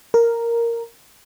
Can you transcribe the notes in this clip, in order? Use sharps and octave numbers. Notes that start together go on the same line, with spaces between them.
A#4